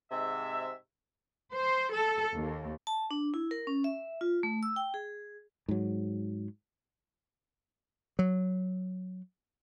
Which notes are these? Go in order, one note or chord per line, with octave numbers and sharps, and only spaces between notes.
G#2 C3 E5
C5
A4
D#2
A5
D4
E4
A#4
C#4
E5
F4
A3
E6
G5
G#4
G#2 F#3
F#3